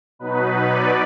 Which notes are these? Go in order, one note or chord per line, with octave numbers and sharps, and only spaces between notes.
B2 F#3 B3 D#4 B4
D5